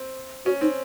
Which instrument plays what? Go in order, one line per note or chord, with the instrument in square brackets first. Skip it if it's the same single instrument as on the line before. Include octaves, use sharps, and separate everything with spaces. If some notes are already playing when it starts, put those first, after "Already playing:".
Already playing: [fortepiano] C4
[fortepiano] C#4 [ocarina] F#4
[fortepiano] C4 [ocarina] D#4